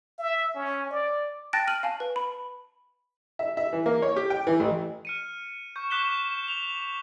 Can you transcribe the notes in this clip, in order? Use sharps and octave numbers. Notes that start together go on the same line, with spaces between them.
E5
C#4
D5
G5 A5 F#6 A6 A#6 D7
F6 D#7 F#7
F5 G#5 A5
B4
B5
E5
E5
E3
A#3
C#5
G4
G5
E3
A1
F6 C#7 D#7
C#6 G6
C#6 D6 F#6 B6 E7 G7
F7